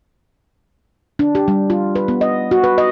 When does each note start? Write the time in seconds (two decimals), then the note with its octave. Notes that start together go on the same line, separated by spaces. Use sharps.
1.19 D4
1.35 G4
1.48 G3
1.70 F4
1.95 B4
2.08 B3
2.21 D#5
2.51 F#4
2.64 B4
2.78 D#5